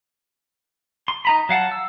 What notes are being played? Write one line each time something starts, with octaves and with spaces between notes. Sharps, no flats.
C6
D#4 A#5 B5
F#3 F5 F#5 A5
E6